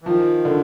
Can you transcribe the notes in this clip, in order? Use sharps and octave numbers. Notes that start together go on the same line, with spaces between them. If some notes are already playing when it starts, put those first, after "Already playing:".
E3
D#3 F3
D3